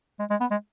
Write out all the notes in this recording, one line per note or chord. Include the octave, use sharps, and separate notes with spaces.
G#3
G#3
B3
G#3